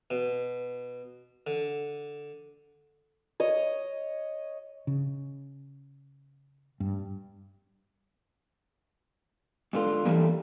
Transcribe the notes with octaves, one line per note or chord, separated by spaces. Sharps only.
B2
D3
C#5 D#5
C#3
G2
G#2 D3 F4
D3 E3 G3 A3 A#3